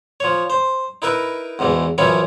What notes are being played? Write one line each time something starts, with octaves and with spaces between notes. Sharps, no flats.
F3 C#5
C5
D#4 E4 A#4 B4 E5
E2 G#2 B2 E3
F#2 E3 F3 C#4 C#5 B5